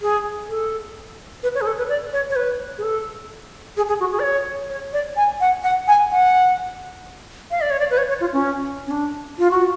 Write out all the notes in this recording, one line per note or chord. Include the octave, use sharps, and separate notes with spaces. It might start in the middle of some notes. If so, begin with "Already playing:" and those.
G#4
A4
B4
C#5
G#4
A4
B4
D5
C#5
C#5
B4
G#4
A4
G#4
G#4
F#4
G#4
D5
C#5
C#5
D5
G#5
F#5
F#5
G#5
F#5
F5
D5
C#5
D5
B4
C#5
C#5
F4
C#4
C#4
D4
F4
F#4